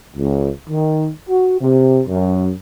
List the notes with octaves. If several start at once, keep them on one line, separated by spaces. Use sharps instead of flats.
C#2
D#3
F#4
C3
F#2